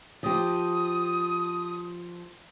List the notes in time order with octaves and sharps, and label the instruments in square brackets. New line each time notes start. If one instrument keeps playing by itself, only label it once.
[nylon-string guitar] F3 G4 [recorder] D#6